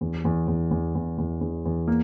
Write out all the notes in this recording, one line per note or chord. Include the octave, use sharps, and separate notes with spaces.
E2
E2
E2
E2
E2
E2
E2
E2
A#3